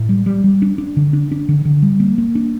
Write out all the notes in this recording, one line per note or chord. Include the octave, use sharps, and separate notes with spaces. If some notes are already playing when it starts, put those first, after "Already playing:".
Already playing: A2
G3
G3
G3
D4
D4
D3
D4
D4
D3
D3
G3
A#3
A#3
D4